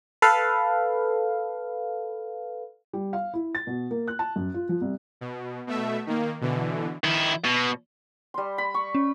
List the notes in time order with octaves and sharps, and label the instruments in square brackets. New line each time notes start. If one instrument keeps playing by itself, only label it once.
[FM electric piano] A4 B4 F5
[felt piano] G3
F5
E4
A6
B2
A#3
F#6
A5
F#2
F4
F3
C2
[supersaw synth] B2
B2 A3 E5
D#3 A#3
B2 D3 E3
[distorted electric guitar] D#3 E4
B2
[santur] G3 C6
B5
C#6
[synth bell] C#4